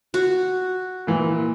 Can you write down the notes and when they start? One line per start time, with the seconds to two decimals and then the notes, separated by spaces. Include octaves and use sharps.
0.14 F#4
1.07 A#2 E3